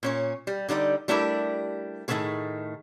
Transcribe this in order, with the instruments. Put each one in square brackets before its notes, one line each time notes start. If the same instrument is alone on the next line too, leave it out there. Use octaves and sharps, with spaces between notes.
[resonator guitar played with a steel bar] A#2 C#4 C#5
G3
D3 G3 D#4 D5
G3 A3 D4 E4 G4 A#4
A2 D#3 E3 A3 A#3 G#4